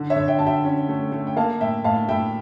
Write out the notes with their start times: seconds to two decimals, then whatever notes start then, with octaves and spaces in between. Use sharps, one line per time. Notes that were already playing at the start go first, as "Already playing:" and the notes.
Already playing: D3
0.10 C#5 E5
0.16 D3
0.28 E5 G5
0.39 D3 A5
0.46 E5 G5
0.65 C#4
0.89 A3
1.12 A3
1.27 G5
1.36 A#3 F5 A5
1.61 A2 E5 G5
1.84 A2 F5 A5
2.09 A2 E5 G5